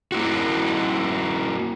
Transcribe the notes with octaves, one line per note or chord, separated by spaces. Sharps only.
A#3 E4 F#4